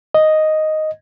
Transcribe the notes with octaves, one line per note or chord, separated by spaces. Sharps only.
D#5